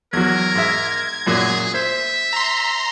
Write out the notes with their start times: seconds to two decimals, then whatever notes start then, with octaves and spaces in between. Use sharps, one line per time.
0.13 E2 F#3 A#4 G#6
0.55 G#2 E5
1.27 F#2 A#2 F#3 G#4
1.74 C5 E5
2.33 A#5 C6